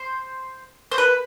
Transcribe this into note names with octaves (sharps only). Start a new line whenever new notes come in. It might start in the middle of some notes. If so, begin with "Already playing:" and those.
Already playing: C5
C5
B4